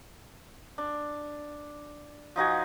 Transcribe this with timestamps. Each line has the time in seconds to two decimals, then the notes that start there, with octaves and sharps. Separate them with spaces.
0.78 D4
2.36 F3 D#4 F#4 G#5